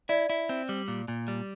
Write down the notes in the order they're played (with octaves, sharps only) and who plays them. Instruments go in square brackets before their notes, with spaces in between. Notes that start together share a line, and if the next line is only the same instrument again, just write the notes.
[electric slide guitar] E4 [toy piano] D5
[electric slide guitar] E4
C4
G3
A#2
A#2
G3